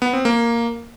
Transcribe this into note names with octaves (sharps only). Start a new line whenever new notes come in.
B3
C4
A#3